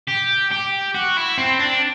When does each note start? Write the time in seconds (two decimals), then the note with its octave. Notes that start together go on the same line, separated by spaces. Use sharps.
0.08 G4
0.51 G4
0.94 F#4
1.17 E4
1.38 C4
1.59 D4